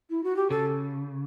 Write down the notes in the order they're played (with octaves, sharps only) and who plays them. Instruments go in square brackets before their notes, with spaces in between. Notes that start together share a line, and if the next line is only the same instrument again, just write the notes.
[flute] E4
F#4
G4
[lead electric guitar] C#3 [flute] A4